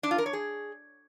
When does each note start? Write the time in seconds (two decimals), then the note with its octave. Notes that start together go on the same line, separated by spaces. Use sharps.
0.03 D4
0.11 F4
0.18 A#4
0.26 C#5
0.33 G#4